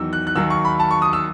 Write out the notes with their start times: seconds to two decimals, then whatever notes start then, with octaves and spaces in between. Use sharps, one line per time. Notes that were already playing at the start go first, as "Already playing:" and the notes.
Already playing: E2 D#3 F#3 E6
0.13 F#6
0.27 F#6
0.36 D#2 D#3 F#3 E6
0.50 C#6
0.65 B5
0.80 A5
0.91 C#6
1.02 D#6
1.13 E6